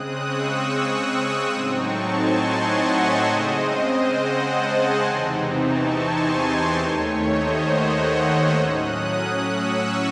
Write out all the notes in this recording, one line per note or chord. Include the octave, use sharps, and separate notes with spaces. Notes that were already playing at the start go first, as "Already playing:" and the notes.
Already playing: C#3 G#3 C4 D#6 F#6
C#6 E6
A2 F#3 C4 D#4 C6 D#6
A5 C#6
G#5 C6
D#5 F#5
C#5 E5
C#5 E5
C#3 G#3 C4 C5 D#5
D#5 F#5
F#5 A5
G#5 C6
E2 C3 E3 C4 D#4 G#5 C6
A5 C#6
G#5 C6
D#2 D#3 A3 C#5
C5 D#5
D#5 F#5
D#5 F#5
C#6 E6
A2 F#3 C#4 D#6 F#6
C#6 E6